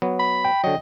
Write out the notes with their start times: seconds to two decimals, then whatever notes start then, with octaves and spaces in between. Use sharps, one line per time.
0.02 F#3 B3
0.19 B5
0.45 G5
0.64 D3 F#3 D#5